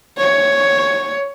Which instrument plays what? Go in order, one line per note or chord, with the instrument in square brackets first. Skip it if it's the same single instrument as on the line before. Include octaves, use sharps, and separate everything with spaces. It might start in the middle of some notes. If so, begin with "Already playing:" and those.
[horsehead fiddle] C#5